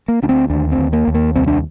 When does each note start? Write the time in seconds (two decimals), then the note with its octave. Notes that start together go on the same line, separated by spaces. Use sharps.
0.08 A#3
0.23 D2 D4
0.29 C4
0.50 D#2 D4
0.72 C4
0.78 D#2
0.93 A#3
1.08 D#2
1.14 A#3
1.36 C2 C4
1.47 D4